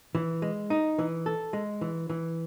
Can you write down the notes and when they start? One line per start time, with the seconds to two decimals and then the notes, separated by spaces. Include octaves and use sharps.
0.15 E3
0.42 G#3
0.70 D#4
0.98 E3
1.26 A4
1.53 G#3
1.81 E3
2.10 E3